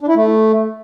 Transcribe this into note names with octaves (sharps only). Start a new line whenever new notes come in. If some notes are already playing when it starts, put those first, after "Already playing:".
D4
E4
A3